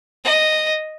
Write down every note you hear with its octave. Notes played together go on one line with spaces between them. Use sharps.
D#5